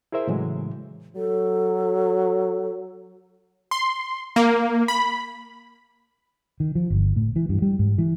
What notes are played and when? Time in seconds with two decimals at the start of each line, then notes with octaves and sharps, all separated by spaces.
0.12 E4 G#4 A#4 C5 E5
0.27 A2 C#3 E3 F#3 G#3
1.16 F#3 A4
3.71 C6
4.36 A#3
4.88 B5
6.60 D#3
6.75 F3
6.90 G1
7.16 A2
7.36 E3
7.49 G2
7.62 G3
7.79 G#2
7.98 E3